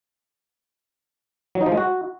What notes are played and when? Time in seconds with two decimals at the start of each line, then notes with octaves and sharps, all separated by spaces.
1.55 F#3
1.61 D#4
1.66 F3
1.72 G#3
1.77 F#4